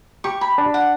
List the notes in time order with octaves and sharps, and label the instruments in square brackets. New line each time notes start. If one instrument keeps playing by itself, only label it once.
[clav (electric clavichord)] G4 [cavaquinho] C#6
[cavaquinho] B5
[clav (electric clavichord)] D4
[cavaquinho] F#5